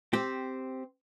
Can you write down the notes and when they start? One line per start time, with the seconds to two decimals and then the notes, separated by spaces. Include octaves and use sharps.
0.13 C4 G4